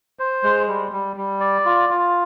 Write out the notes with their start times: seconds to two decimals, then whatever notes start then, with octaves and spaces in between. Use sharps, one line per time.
0.19 C5
0.44 G#3
0.68 G3
0.92 G3
1.16 G3
1.40 D5
1.65 F4
1.89 F4